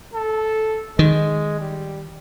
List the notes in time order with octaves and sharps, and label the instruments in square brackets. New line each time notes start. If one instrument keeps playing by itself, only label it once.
[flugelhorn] A4
[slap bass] D#3 [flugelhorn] G#3
[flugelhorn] G3